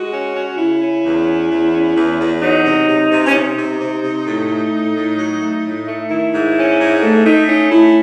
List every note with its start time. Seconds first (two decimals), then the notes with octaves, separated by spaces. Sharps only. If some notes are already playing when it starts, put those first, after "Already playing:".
Already playing: G#3 F#4
0.13 C#4
0.35 C#4
0.58 C#3 E4
0.81 C#4
1.04 E2
1.27 C#4
1.50 E2
1.73 C#4
1.96 E2
2.20 E2
2.42 F#3 D#4
2.65 C3
2.88 C3
3.11 C3
3.27 C#4
3.34 C3 D#4
3.57 C3
3.80 C3
4.03 C3
4.26 A2
4.49 A3
4.72 A2
4.96 A2
5.18 F#3
5.41 A3
5.65 A2
5.87 A3
6.10 D#3 E4
6.33 G#2
6.57 C#4
6.79 G#2
7.03 A3
7.25 A3 D#4
7.48 C#4 D#4
7.72 A3 E4